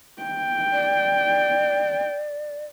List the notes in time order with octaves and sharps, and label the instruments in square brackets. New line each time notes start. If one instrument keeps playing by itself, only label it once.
[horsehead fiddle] G5
[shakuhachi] D5